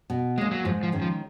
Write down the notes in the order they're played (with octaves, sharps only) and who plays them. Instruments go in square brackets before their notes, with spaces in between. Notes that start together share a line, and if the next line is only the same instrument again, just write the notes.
[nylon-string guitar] B2
[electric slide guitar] G#3 [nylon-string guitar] A#3 C#4
[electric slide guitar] F#3
[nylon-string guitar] G#2 [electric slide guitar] F3
[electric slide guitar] F3
[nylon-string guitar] D#3 G#3 C#4
[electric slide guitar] F3